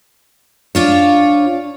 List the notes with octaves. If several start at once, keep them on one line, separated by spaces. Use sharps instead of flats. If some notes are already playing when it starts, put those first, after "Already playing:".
D4 F4 C#5